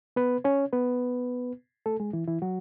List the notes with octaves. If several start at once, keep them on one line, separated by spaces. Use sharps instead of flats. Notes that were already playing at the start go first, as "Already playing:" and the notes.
B3 B4
C#4 C#5
B3 B4
A3 A4
G#3 G#4
E3 E4
E3 E4
F#3 F#4